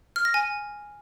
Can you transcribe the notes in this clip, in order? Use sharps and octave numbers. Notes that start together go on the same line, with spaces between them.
F6
A#6
G#5